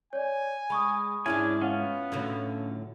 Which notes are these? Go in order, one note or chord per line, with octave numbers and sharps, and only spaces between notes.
C#5 D5 G#5
G#3 B5 C#6 D#6
G#2 G#3 C#4 D4 E4 G#5
B3 C#4 F4 F#5
A2 D3 F#3